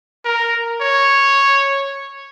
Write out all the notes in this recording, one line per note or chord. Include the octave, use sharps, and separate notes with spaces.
A#4
C#5